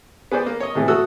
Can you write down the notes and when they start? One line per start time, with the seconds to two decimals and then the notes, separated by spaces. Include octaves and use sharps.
0.32 B3 G#4 C5 D5
0.46 A#3
0.60 C#5 D#5
0.75 A2 C3 E3 B3
0.88 A3 F#4 A4 C#5 D#6 E6